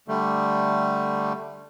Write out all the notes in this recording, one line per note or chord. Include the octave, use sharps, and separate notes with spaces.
D3 G3 A3